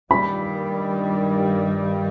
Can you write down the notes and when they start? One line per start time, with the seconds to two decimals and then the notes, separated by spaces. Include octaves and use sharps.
0.11 G2 D#3 G3 B5